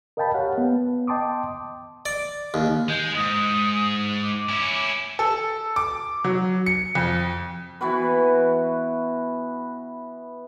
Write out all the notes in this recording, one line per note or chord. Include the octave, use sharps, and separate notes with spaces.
A#4 D#5 F5 G5 A5 B5
G4 C#5 F5 F#5
B3
D#5 G5 A5 C6 D6 D#6
D5
D#2
G#3 G6
G#2 D#6
D6
C#4 E4
A4
D6
F#3
C#7
F2
E3 B3 F#4 B4